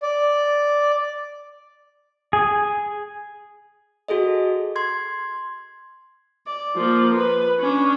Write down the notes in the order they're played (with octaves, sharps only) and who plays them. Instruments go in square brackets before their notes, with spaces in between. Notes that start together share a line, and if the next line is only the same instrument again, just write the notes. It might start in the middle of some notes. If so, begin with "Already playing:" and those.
[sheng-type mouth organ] D5
[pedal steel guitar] G#4
[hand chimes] F#4 G#4 A4 D#5
C6 G#6
[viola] D5
F3 A#3
B4
C#4 D4